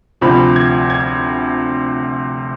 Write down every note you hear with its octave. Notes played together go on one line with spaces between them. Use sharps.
D2 C3 F3 B5
G#6
G#6